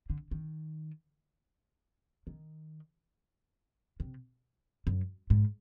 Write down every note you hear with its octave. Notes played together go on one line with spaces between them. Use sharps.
D3
D#3
D#3
C3
F#2
G#2